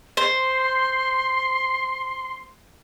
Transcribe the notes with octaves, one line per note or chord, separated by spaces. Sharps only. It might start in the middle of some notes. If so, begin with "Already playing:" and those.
C5 C6